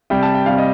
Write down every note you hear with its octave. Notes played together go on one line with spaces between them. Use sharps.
C3 G3 G5
A5
G5
C3 G3 F5
D#5